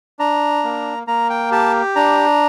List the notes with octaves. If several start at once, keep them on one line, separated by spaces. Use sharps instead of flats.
D4 A#5
A#3
A#3 A#5
G5
G4 A5
D4 A#5